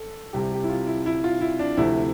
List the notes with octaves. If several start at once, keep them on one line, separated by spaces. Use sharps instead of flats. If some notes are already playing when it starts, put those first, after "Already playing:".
Already playing: A4
C2 C3 G3 G4
G4
E4
F4
E4
E4
F4
E4
D4
D2 C3 F3 A3 E4